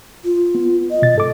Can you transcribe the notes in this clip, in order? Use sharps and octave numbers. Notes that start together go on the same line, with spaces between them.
F4
B3
D#5
B2 A6
G#2 A4 D6